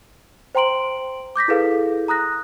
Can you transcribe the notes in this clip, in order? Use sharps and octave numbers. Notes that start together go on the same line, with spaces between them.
C5 G5 A#5 C6 D7 F#7
D6 G6 A#6 B6
E4 G#4 A4 B4 F5
A#5 D#6 F#6 A#6